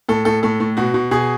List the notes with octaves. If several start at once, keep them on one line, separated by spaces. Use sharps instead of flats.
A2 A4
A2 A4
A2 A4
A2
B2 F#4
B2
B2 G#4